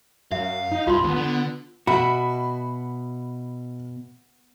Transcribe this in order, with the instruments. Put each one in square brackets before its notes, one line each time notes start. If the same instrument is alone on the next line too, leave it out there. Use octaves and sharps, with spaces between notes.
[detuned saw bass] F#2 [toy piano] E5 [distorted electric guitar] F5
[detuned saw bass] D#4
[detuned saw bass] C2 [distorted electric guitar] G2 [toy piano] F4 C6
[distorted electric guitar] D#2 [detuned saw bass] B3
[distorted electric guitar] D3
[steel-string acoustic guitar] B2 [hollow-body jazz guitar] F#4 [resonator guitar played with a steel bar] E5 [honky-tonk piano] B5